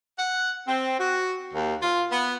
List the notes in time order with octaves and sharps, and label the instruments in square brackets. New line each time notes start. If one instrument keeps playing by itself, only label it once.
[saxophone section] F#5
C4
F#4
D#2
F4
B3